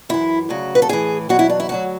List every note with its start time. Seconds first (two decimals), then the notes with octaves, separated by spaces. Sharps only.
0.09 F#2 E3 E4
0.49 D2 C#3 F#3 F#4
0.75 B4
0.82 A4
0.89 A2 E3 G#4
1.29 E2 B2 F#3 F#4
1.39 E4
1.50 D4
1.60 E4
1.69 D2 D3 F#3 F#4